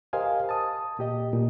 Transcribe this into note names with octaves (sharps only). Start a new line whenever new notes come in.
G4 A#4 C5 D#5 F5 G#5
A5 D#6
A#2 G4 D#5
A#2